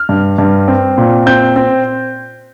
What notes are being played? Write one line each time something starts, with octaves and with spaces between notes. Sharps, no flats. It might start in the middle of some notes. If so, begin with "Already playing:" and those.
Already playing: F6
G2
G2
C4
A#2
C4 G6
C4